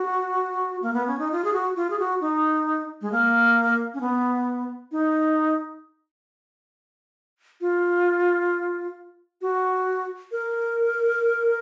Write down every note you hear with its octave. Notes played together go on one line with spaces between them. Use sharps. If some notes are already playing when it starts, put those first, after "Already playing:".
Already playing: F#4
A#3
B3
C#4
D#4
F4
G#4
F#4
F4
G#4
F#4
D#4
G#3
A#3
C#4
B3
D#4
F4
F#4
A#4